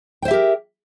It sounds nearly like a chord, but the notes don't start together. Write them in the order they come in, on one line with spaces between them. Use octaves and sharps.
G5 C5 E5 G4 A#4